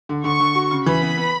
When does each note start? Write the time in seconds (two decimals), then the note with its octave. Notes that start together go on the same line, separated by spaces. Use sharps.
0.09 D3
0.24 D3 C#6
0.40 D3
0.55 F#4
0.71 C#3
0.86 E3 B5
1.02 B3
1.18 B3